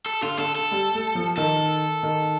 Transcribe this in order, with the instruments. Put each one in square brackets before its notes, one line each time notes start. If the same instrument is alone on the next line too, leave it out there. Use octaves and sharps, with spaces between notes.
[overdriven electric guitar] A4
[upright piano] D3 [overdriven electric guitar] F4
[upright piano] D3 [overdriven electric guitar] A4
[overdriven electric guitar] A4
[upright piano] G3
A3
F3
[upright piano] D#3 [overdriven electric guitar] A4
[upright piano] D#3